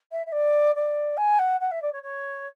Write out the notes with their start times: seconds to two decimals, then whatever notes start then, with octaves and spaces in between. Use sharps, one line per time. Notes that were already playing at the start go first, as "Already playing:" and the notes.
0.11 E5
0.26 E5
0.32 D5
0.75 D5
1.17 G#5
1.39 F#5
1.60 F#5
1.71 E5
1.82 D5
1.92 C#5
2.03 C#5